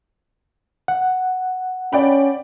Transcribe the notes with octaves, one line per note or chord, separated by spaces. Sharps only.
F#5
C#4 D5 G5 B5